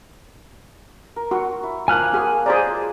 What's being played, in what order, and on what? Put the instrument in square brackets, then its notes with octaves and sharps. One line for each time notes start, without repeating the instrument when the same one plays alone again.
[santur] A#4
[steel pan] F#4
[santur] E4
[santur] F3 A#3 [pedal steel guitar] G#5 F6 F#6
[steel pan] F#4 G#4
[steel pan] G#4 C5 D5 [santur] A#5